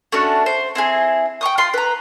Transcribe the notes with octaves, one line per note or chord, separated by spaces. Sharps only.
A3 C#4 D4 F#4
C5
C4 E4 G#4
G5 A#5 C#6 D#6
F4 C6
B4 A#5